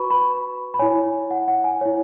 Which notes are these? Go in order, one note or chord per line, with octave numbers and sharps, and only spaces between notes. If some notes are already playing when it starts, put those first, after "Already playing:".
Already playing: F#4 B4 B5 C#6
B5
B5
E4 C#5 G#5
F#5
F#5
G#5
E4 C#5